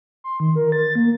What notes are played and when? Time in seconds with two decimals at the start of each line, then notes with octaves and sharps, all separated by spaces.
0.24 C6
0.40 D#3
0.56 A#4
0.72 A6
0.95 A#3